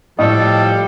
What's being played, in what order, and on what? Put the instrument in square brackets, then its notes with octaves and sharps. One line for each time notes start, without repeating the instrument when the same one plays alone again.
[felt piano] A2 [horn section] F3 G3 [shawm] A4 [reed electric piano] D#5